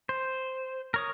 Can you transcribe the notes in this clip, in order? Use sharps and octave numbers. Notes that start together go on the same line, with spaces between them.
C5
A#4 C#5 D#6